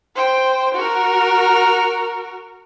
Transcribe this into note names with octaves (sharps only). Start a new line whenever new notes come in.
C5 G5
F#4 A#4